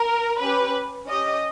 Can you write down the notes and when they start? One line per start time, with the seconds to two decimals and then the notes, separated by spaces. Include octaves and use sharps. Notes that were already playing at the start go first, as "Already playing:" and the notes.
Already playing: A#4
0.40 C#4 G4 B4
1.06 C#4 G4 D#5